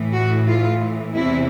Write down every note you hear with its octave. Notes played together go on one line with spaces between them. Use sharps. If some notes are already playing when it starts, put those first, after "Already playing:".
Already playing: A2 E3
F#4
F4
E2 C3 E3 E4